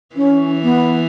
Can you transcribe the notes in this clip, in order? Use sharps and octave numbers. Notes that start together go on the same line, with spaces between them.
E3 C#4
B3